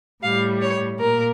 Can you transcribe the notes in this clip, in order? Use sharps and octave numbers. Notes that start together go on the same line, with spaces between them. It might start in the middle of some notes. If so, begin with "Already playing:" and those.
A2 G3 F5
C#5
A#2 A#4